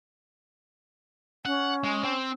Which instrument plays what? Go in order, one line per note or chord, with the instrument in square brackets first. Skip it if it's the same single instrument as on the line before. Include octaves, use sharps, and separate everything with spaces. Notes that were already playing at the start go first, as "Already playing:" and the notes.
[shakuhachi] C#4 [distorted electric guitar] F#5
[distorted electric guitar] G#3
C4